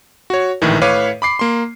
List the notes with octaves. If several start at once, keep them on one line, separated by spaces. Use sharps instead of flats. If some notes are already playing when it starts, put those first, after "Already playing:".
F#4 C#5
A#1 A2 D#3 E3
A2 B4 C#5 F5 D6 D#7
B5 D6 C7
A#3 C6